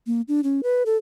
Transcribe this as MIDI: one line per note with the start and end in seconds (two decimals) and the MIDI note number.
0.07 0.21 58
0.28 0.41 62
0.44 0.61 61
0.63 0.83 71
0.86 0.97 69